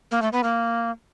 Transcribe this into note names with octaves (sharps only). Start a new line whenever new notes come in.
A#3
A3
B3
A#3